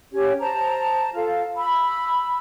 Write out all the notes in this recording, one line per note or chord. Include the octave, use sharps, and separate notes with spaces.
C#4 G4 C#5
C5 A5 A#5
F4 A4 F5
B5 E6